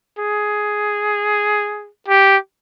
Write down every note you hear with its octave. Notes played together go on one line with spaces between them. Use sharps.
G#4
G4